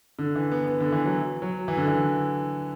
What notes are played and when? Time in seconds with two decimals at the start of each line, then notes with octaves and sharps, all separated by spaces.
0.19 D3
0.35 E3
0.52 B3
0.68 B3
0.80 D3
0.92 E3
1.06 F#3
1.42 F#3
1.68 E3
1.77 D3
1.88 E3